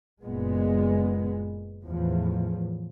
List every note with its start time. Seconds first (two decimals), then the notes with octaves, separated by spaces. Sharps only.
0.23 F#1 A#2 G#3 B3
1.85 E2 A2 F3